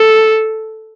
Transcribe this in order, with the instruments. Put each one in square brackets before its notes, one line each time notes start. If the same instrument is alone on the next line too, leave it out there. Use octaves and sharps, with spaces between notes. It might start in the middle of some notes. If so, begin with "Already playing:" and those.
Already playing: [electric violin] A4